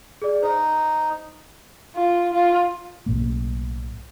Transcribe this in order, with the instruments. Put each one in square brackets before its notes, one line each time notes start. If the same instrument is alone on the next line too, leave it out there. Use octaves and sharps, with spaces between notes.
[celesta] G#4 D5
[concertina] D#4 [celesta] C5
[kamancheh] F4
F4
[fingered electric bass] B1 A2 A#3